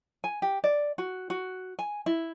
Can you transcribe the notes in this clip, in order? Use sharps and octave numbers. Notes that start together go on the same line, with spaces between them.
G#5
G4
D5
F#4
F#4
G#5
E4